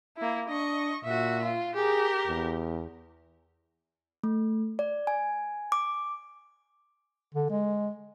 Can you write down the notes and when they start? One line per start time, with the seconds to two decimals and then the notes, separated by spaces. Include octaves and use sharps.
0.17 A#3 E4
0.49 D4 D#5 C#6
1.04 A#2 F#4 E5
1.43 F4
1.75 G4 G#4 A#4
2.27 E2
4.24 A3
4.79 D5
5.07 G#5
5.72 D6
7.34 D3
7.50 G#3